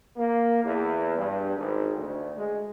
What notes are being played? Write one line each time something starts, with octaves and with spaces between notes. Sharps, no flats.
A#3
E2
G2
G#1
D2
G#3